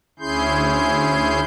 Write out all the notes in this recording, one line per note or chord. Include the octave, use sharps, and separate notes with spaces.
D2 C#4 E4 G#4 C6 G6